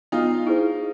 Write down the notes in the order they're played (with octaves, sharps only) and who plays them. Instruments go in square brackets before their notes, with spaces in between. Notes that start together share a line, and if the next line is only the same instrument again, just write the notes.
[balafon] B3 [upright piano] D#4 F4
[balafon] E4 G#4 C5